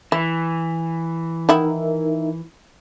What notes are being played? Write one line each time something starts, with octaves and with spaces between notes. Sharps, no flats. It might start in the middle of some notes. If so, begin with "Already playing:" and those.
E3 E4
D#3 D#4 E4 A#4 E5 F#5